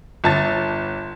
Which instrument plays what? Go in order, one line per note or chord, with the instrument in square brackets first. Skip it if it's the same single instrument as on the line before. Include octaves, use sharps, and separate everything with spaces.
[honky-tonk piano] G1 A5 A6